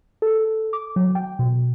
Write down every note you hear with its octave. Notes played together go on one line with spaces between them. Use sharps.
A4
D6
F#3
G5
B2